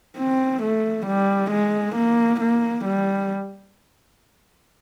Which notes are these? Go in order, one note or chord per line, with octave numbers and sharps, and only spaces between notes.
C4
A3
G3
G#3
A#3
A#3
G3